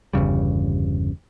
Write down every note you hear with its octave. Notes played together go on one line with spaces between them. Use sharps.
G1 E2 C#3 G3